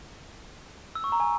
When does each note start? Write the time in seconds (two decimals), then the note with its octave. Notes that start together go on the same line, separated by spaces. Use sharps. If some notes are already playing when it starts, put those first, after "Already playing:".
0.95 E6
1.04 C#6
1.12 A#5
1.20 G#5